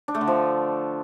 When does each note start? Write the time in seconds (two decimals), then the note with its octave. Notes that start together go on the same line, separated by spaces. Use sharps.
0.08 D4
0.15 A3
0.21 D3
0.27 F3